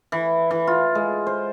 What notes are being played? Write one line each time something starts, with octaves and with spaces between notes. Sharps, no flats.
E3
E3
F4
G#3
C5